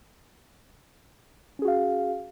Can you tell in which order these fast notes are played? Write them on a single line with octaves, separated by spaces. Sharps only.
C#4 G#4 F#4 F5